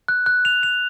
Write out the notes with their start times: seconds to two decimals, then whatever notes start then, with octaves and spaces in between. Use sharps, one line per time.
0.08 F#6
0.26 F#6
0.45 F7
0.63 F7